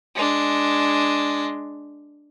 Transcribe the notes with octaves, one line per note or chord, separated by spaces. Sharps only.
G#3 D4